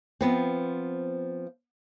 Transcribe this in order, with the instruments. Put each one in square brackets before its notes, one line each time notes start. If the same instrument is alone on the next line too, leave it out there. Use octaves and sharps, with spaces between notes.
[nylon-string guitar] F3 B3 C4